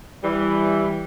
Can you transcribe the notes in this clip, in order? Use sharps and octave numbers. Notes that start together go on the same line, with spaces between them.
E3 G3